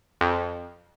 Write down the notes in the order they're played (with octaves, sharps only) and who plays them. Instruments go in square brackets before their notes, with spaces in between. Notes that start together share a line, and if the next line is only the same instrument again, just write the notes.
[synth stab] F2